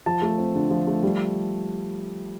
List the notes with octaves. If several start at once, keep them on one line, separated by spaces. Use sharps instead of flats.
F3 A5
A3
C4
D3
F3
A3
G3